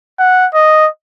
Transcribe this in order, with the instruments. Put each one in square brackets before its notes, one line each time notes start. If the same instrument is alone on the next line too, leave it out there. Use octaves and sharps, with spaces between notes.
[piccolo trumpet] F#5
D#5